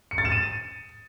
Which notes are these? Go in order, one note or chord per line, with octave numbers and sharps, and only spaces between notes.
C#7
A6
E7
D#7